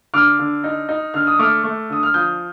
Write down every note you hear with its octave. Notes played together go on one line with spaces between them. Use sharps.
D3 D6 F6
D3
D#4
D#4
D3 F6
D#6
A3 D6 F6
A3
D3 D#6
F6
F3 D#6 G6